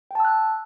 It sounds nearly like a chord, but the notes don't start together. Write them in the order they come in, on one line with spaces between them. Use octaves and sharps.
G5 A5 E6 F#6